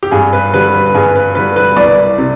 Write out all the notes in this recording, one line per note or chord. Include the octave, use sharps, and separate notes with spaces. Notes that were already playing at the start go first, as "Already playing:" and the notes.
G4
G2 G#4
B4
D3 G3 B4
B4
B4
G2 G#4
B4
D3 G3 B4
B4
C2 D5
C3